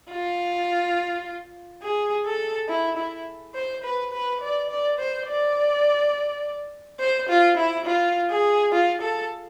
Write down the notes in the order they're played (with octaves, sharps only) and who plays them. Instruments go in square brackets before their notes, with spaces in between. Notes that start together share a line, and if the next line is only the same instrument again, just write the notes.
[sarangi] F4
G#4
A4
E4
E4
C5
B4
B4
D5
D5
C5
D5
C5
F4
E4
F4
G#4
F4
A4